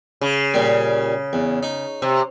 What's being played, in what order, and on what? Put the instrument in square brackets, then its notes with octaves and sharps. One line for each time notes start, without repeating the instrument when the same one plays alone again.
[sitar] C#3
[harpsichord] A#2 G3
E2
D#4
[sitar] C3